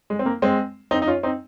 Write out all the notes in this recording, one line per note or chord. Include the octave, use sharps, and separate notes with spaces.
G#3
C4
A#3
G#3 C4
C4 D#4
D#4
C#4 F4
C4 D#4